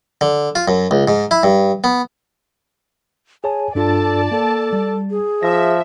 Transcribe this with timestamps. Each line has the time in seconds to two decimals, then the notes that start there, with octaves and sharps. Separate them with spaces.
0.21 D3
0.55 F4
0.68 F#2
0.91 C#2
1.08 G#2
1.31 E4
1.43 G2
1.84 B3
3.44 G#4 C#5 G#5 A5
3.75 G2 D4 F4 A4 D5 A5
4.31 A#3 A4
4.73 G3
5.10 G#4
5.43 F3 E5 A#6